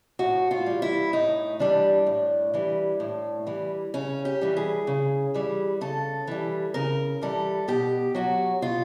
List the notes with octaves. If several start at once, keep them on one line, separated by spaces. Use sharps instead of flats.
A2 F#4
F4
E3 G3
E4
A2 D#4
E3 G3 D4
A2
E3 G3
A2
E3 G3
C#3 C#4
G4
E3 G3
G#4
C#3
E3 G3
C#3 A4
E3 G3
C#3 A#4
E3 G3 A4
B2 G4
F#3 F#4
B2 F4